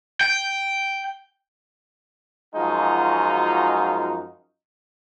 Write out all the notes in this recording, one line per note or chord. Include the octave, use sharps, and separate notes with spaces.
G5
F#2 F3 G#3 D#4 F4 F#4